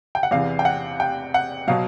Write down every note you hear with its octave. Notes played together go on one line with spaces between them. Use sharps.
G5
F#5
E2 C3 E3 F5
G5
F#5
G5
F#5
B2 F#3 F5